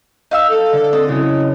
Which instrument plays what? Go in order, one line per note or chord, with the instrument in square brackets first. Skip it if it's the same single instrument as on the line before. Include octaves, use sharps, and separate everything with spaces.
[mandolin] D#4 F5 E6
[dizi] A4
[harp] D3
[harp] C4 A5 [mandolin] D#5
[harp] F#2 C#3 [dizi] E4